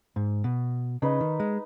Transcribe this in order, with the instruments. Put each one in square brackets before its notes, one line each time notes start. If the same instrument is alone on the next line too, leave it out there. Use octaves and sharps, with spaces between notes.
[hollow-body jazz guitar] G#2
B2
[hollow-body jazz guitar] C#3 [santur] D#4 B4 D#5
[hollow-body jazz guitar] D#3
G#3